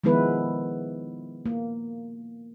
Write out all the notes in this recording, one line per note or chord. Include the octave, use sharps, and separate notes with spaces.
D#3 F3 G#3 B3 E4 B4
A#3